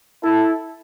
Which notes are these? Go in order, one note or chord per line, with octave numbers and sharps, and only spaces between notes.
E4 A4